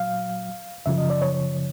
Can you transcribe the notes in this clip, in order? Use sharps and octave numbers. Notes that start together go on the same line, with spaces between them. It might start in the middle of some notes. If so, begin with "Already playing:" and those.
Already playing: A#2 F#3 F5
F#2 C#3 F3 E5
D#5
D5
C#5
C#5